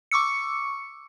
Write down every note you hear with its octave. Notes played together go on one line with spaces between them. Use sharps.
C#6 D6 E6 C#7